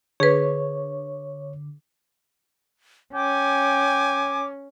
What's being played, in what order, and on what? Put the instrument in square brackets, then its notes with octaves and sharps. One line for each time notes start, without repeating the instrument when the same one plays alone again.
[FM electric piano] D3 [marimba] G#4 B4 [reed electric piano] C#5
[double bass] C#4 [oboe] G5 [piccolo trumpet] G#5 [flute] D6